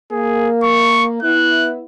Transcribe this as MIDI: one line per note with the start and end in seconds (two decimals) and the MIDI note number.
0.12 1.18 58
0.12 0.49 68
0.63 1.05 85
1.23 1.81 59
1.23 1.81 64
1.23 1.69 90